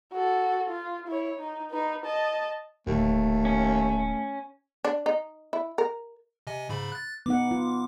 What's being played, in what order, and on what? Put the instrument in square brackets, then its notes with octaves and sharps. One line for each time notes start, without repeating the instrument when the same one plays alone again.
[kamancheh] F#4 A4
F4
E4 C#5
D#4
D#4 B4
D#5 A5
[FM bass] D1 [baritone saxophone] D#2 [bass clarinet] A3
[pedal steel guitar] C#4
[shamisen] D4
D#4
E4
A#4
[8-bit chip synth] C3 D#5 G#5
G#2 C#3 B5
F#6 A6
[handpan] B3 D#4 F#5 [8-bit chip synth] D6
[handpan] F4